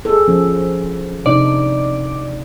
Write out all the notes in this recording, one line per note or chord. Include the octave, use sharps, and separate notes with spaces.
G#4 A4
F3 C#4
C3 D4 D#4 D5